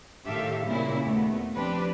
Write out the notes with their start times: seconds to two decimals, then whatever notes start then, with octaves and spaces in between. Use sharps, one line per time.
0.26 A2 D#3 G4 A4 E5 F5
0.66 A#2 C#3 G3 A#3 C4 E4
1.01 D#2 A3 B3
1.54 F3 C4 D4 G4 B4